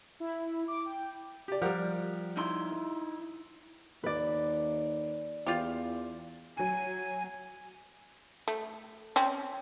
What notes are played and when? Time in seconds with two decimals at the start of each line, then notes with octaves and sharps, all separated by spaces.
0.20 E4
0.68 D6
0.85 G5
1.48 G4 D5
1.62 F3 G3 G4 A#4 F#5
2.37 D#4 E4 C6
4.03 D#2 B4 D5
5.47 E2 F4 G4
6.57 F#3 G#5 D#7
8.48 A3
9.16 C4 C#4